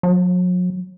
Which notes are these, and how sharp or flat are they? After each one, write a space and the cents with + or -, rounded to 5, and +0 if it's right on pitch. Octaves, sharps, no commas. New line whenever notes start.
F#3 -40